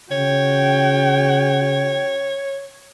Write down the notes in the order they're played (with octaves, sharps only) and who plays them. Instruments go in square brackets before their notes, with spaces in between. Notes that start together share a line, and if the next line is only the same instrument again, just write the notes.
[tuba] C#3 [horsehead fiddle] F#4 G5 [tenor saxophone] C#5